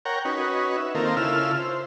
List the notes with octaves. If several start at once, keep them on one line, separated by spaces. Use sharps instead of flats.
A#4 C#5 F#5 G5 A#5
C#4 D#4 F#4 B4
E5
D#3 A#3 C4 F4 A4 A#4
C#3 E4 F4 A4 E6 F6
C5